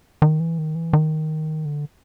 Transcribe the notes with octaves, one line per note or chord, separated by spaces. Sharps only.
D#3
E3
D#3
E3
D#3
D3